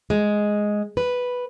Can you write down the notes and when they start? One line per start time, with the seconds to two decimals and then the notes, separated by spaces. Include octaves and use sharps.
0.10 G#3
0.97 B4